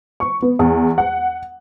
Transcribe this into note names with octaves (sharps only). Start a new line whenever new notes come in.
C#6
B3
E2
F#5